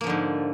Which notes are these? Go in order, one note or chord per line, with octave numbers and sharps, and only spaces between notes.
G#2 D3 F3 A#3